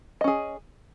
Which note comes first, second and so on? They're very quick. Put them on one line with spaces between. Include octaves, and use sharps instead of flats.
D#5 C#4 G#4